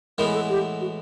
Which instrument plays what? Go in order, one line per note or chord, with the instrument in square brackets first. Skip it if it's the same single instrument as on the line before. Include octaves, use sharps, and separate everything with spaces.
[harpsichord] A2 E3 G#3 B3 [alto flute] A#4
[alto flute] A4
G4
F#4